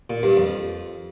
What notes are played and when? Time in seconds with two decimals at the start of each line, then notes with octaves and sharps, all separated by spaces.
0.10 A#2
0.23 G2
0.37 F2